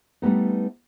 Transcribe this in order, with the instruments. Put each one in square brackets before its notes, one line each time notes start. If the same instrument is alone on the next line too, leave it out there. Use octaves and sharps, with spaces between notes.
[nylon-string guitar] G3 A3 B3 D#4